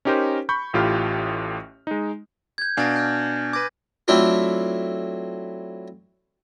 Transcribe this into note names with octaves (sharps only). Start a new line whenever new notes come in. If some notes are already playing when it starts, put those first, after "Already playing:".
C#4 D#4 G4 A#4 C5
B5 C#6 G6
A1 A2 F4 G4 B5 F6
G#3 D#4
G6 G#6
B2 D4 F5 G#5 A6 A#6
F6 G6
B4 D6 G#6 A#6 D#7
F#3 A3 C4 D4 E4 F4